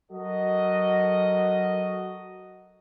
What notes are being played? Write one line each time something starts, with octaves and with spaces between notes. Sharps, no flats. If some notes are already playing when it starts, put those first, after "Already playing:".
F#3 F#4 A4 A#4 D#5